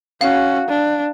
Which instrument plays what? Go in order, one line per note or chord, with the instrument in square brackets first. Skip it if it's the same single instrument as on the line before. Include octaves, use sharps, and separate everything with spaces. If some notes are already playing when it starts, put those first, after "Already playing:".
[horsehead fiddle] C#4 F#4 [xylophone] F5
[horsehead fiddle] D4